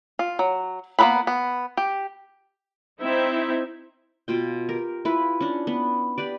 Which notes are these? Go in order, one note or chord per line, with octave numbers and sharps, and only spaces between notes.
F4
F#3
A#3 B3 A4 B4 B5
B3
G4
C4 D#4 E4 E5
B2 F4 G5
G4 A#4
E4 F4 B4
C#4 D4
B3
G4 B4 D5